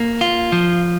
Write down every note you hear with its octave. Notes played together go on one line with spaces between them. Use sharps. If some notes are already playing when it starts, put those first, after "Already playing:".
Already playing: A#3
F4
F3